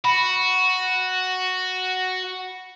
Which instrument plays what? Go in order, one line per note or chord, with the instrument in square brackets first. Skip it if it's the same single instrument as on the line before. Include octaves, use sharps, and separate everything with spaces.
[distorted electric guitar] F#4 [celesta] B5